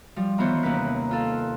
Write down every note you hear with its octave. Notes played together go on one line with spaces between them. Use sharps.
F3 G3
D#3 E3 B3 F4 C5 C#5
D#2 C3 A#3 C#4 B4 F#6
F4 A4 F5